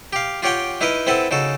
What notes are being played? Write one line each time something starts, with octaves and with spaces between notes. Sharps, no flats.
G4 F5
F4 G4 C#5 F#5 G5
D#4 E4 A#4 B4 D#5
C4 E4 A4 B4 F#5
C#3 D#4 F#4 A4